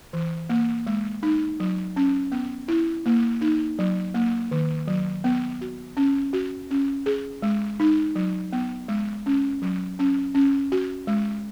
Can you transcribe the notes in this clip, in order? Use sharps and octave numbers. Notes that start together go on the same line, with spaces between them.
E3
A#3
G#3
D#4
F#3
C#4
B3
E4
A#3
D#4
F#3
A#3
D#3
F#3
B3
F#4
C#4
F#4
C#4
G#4
G#3
D#4
F#3
B3
G#3
C#4
F#3
C#4
C#4
F#4
G#3